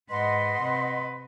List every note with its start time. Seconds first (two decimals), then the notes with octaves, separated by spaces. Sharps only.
0.10 G#2 B4 D#5 F#5 C6
0.61 C3 B4